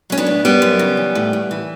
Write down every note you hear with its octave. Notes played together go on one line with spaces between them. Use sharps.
F#3 C#4
B3 D4
A2
F#2 G3 B3
F#2
C#3
E3
A2
A2
E3